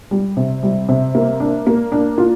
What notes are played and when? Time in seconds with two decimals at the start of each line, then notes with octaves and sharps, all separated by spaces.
0.11 G3
0.37 C3
0.63 G3
0.89 C3
1.15 A#3
1.40 D4
1.67 A#3
1.92 D4
2.18 F4